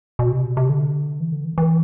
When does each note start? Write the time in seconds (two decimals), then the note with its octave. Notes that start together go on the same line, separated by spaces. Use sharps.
0.19 B2
0.32 C3
0.44 B2
0.57 C3
0.69 D3
1.20 E3
1.32 D3
1.45 E3
1.58 E3